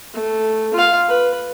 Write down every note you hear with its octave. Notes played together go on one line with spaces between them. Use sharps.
A3
F4 F5
B4